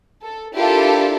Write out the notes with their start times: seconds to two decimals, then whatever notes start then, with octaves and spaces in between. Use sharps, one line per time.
0.23 A4
0.55 D4 E4 F4 G4 A4 A#4